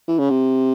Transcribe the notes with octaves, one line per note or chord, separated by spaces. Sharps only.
E3
C#3
C3